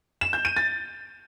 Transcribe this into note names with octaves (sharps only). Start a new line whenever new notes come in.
E7
G6
D#7
A6